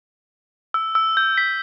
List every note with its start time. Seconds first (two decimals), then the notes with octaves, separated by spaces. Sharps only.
0.74 E6
0.95 E6
1.17 G6
1.38 B6